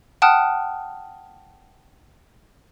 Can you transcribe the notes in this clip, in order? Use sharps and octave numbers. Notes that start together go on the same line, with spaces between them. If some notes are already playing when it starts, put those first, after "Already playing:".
F#5 G5 A5 D#6 F6 F#6